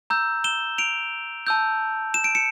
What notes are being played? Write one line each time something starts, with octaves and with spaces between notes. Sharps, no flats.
A#5 E6 G6
E7 G7
D7 F7
A5 E6 G6
E7
D7
C#7 E7